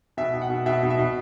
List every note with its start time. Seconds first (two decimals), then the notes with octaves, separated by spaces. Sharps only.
0.17 B2 E5
0.34 B2
0.42 F#5
0.50 B2
0.66 B2 E5
0.83 B2
0.90 E5
0.99 B2